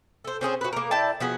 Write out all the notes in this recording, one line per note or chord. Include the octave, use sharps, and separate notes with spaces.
A4 C5
C4 C#4 G#4 C5
F#4 B4
A#3 A#4
E4 D5 G5 A5
F3 B3 F#4 G#4